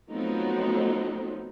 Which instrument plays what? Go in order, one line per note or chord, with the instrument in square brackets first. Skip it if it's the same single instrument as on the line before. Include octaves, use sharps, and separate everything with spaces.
[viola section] F3 F#3 A3 B3 C4 D#4